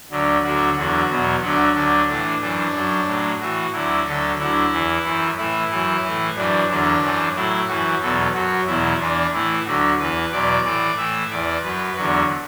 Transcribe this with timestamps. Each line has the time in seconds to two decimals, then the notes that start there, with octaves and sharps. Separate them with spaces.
0.11 D2 D3 F#3
0.44 D2 D3 F#3 F#4
0.77 E2 D3 F#3 F#4
1.10 E2 B2 F#3
1.42 D2 D3 F#3 F#4
1.75 D2 D3 F#3 D4
2.08 A2 E3 D4
2.42 F#2 E3 D4
2.75 F#2 F#3
3.07 A2 F#3
3.40 A2 E3 F#4
3.73 D2 D3 F#3 E4
4.06 D2 D3 F#3 A4
4.39 D2 D3 F#3 E4
4.72 E2 E3
5.04 F#2 E3
5.38 A2 E3 E4
5.71 F#2 E3
6.04 A2 E3
6.37 F#2 E3 D4
6.69 E2 D3 F#3 D4
7.02 F#2 E3
7.35 A2 F#3 E4
7.68 F#2 E3 F#4
8.01 E2 B2 F#3 A4
8.34 F#2 F#3 F#4
8.67 E2 B2 F#3 E4
9.00 E2 E3 D4
9.33 A2 E3 E4
9.66 D2 D3 F#3 F#4
9.99 E2 E3 B4
10.32 E2 B2 F#3 D5
10.65 A2 E3 D5
10.97 A2 E3 E5
11.31 E2 E3 D5
11.64 F#2 F#3 B4
11.97 E2 D3 F#3 F#4